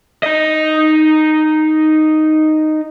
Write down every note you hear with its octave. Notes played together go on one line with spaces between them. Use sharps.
D#4 D#5